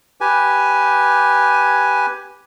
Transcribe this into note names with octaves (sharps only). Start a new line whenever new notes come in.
G4 B4 G#5